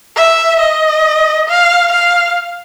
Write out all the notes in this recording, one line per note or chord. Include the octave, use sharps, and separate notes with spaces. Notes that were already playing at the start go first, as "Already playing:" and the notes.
E5
D#5
F5
F5